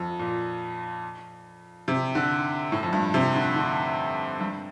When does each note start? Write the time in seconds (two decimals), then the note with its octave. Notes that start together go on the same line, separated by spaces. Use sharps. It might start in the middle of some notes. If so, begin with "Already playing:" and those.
Already playing: F2
0.19 A#2
1.88 C3
2.15 D3
2.72 A2
2.83 F2
2.93 G2
3.14 C3
3.35 D3
3.56 D3
4.40 G2